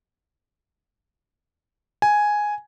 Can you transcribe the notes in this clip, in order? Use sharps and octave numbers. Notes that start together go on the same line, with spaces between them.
G#5